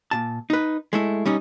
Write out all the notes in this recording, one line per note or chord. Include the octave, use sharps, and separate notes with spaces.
A#2 A5
D#4 B4
G#3 A3 E4
G3 C#4 D#4